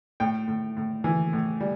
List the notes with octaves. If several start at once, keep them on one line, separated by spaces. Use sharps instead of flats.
A2 G5
A2
A2
E3
A2
G3